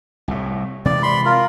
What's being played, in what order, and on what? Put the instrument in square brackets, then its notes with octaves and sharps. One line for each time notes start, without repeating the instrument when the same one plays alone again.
[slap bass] C2 A2
[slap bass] C3 E3 G#3 [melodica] D5
[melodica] B5 C6
F4 A#4